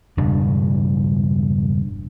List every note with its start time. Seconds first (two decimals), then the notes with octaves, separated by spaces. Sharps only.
0.17 E1 G2 C#3 D4